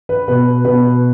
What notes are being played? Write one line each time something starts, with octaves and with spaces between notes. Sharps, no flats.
B4
B2 B4
B2 B4